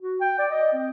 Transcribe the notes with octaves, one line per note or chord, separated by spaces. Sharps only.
F#4
G5
D5
D#5
C4